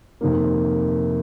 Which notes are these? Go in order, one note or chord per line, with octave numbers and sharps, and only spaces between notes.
F2 C3 D#3 A#3